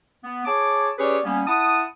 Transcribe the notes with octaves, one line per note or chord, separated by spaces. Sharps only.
B3
G#4 C#5 A5 D6
C#4 G4 G#4 B4 C#5 D5
G3 A#3 B3 C#4
E4 F#5 A5 D#6